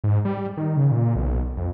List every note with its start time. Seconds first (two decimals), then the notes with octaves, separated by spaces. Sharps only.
0.04 G#2
0.25 G3
0.57 D#3
0.77 C#3
0.91 A#2
1.16 B1
1.57 F2